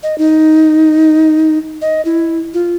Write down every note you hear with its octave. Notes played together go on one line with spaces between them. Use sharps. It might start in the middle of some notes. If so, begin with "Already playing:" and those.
D#5
D#4
D#5
E4
F4